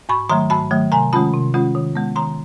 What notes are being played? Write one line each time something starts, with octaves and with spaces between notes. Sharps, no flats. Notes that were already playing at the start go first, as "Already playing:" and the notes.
G#2 B5 C#6
D#3 F#3 A3 A#5 C6
G#2 A5 B5
D#3 F#3 A3
C3 G#5 A#5
D#3 G#3 C#4 F4 A5 B5
C3
D#3 G#3 C#4 F4
D#3
G#3 B3
D#3 A#5 C6